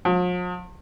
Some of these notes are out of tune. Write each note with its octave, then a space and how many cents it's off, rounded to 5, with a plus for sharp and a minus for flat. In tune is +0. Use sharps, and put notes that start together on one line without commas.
F3 +45